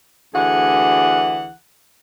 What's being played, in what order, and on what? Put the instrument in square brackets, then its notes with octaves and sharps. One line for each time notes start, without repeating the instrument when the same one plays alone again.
[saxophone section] D2 D3 E3 G#4 F#5